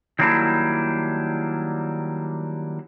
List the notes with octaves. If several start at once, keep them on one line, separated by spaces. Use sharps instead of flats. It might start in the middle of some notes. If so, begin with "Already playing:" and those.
D#3 F#3 G3 A#3 D4 E4